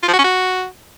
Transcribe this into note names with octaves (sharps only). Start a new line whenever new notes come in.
F4
F3
F#4
C#4
F#4